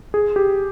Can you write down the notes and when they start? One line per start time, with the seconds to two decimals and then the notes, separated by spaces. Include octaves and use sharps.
0.14 G#4
0.36 G4